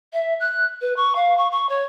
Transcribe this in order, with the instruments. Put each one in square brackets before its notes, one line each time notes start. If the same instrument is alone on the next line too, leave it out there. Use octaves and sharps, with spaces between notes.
[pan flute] E5
F#6
B4
C#6
F5
C#6
C#6
C#5